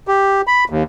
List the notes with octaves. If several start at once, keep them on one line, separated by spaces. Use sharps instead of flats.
G4
B5
D#2